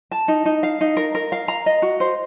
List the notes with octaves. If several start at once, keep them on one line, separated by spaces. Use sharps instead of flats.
A5
D#4
D#4
F5
D#4
A#4
A#4
F5
A#5
D#5
F#4
C5